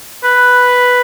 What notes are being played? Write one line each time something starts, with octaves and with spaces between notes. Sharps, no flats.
B4